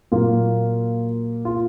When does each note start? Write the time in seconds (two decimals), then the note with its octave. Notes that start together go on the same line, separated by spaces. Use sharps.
0.12 A#2 F#3 A#3 F4
1.45 F4